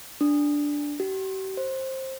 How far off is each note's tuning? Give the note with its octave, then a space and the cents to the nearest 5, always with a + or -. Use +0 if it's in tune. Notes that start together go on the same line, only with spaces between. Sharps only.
D4 -5
G4 -45
C5 +20